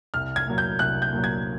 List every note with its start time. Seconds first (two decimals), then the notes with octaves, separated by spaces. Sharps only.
0.14 C2 F6
0.36 G#6
0.47 A#2 F#3
0.58 G6
0.79 C2 F#6
1.02 G6
1.13 A#2 F#3
1.24 G#6